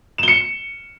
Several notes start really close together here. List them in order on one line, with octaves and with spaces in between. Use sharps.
E7 G7 C#7